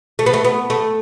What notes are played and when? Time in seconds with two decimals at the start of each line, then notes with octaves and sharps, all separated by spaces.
0.19 A3
0.26 B3
0.33 A3
0.44 B3
0.70 A3